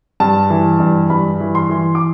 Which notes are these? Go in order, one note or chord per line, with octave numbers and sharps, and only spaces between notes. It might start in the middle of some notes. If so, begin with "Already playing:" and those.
G2 A5
E3
G2
G2 B5
E3
C6
E3
D6